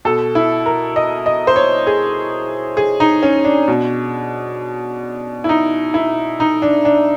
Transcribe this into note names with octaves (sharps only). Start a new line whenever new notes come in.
B2 A4
E4
A#4
D#5
D#5
C5
C#5
G#4
G#4
D#4
C#4
D4
B2
E4
D#4
E4
D#4
D4
D4